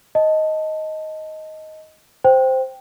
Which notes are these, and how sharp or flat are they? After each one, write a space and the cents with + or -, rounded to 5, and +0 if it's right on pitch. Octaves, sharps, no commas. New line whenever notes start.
D#5 +10 A5 +0
C5 +0 G5 +0